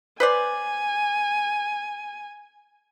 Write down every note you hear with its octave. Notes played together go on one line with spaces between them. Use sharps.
B4 C5 D5 G#5